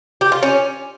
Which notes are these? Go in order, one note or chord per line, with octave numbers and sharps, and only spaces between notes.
G4
F4
C#4